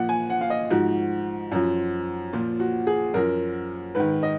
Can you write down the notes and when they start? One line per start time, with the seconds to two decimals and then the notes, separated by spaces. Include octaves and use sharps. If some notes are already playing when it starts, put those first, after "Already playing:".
Already playing: A#2 F3 F#5
0.09 G#5
0.30 F#5
0.41 F5
0.50 D#5
0.71 G#2 F3 F#4
1.52 F#2 F3
2.33 A#2 F3 F4
2.60 F#4
2.87 G#4
3.14 F#2 F3 A#4
3.95 G#2 D#3 B4
4.23 D#5